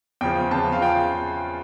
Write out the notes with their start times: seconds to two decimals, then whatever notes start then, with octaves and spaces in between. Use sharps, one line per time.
0.21 E2 C#3 F3 G5
0.51 E2 C#3 F3 A5
0.72 F5
0.81 C#3 F3 G5